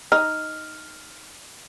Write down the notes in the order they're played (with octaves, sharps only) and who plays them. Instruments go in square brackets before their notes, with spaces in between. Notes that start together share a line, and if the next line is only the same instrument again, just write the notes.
[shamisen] D#4 [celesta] F6